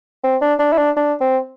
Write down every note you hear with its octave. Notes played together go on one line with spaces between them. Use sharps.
C4
D4
D4
E4
D4
D4
C4